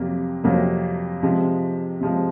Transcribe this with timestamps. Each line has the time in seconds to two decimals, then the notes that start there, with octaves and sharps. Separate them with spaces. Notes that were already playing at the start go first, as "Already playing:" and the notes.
Already playing: F2 C3 F#3 A#3
0.44 F2 C3 F#3 A#3
1.23 C3 F3 G#3
2.01 C3 F3 G#3